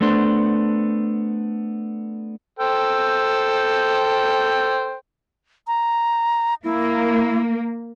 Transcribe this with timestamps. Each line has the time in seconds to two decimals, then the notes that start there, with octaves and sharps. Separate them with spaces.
0.01 A3 B3 D4 C5
2.59 A4 C5 G5
5.67 A#5
6.64 A#3 E4